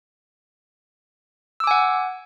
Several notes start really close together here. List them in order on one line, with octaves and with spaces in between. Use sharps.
E6 D6 G#5 F#5